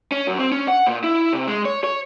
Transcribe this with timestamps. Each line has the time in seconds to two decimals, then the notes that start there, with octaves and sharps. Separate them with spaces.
0.12 C#4
0.27 F#2
0.39 C4
0.52 C#4
0.68 F#5
0.87 A#2
1.04 E4
1.33 C3
1.47 G#3
1.65 C#5
1.84 C#5